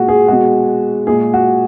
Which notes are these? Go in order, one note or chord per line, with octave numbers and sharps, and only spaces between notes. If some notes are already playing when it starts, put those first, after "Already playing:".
Already playing: A#2 G#3 F#4
G#4
B2 G#3 F#4
A#2 G#3 G#4
F#4